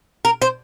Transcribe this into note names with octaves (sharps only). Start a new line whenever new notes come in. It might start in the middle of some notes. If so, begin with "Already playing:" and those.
A#4
C5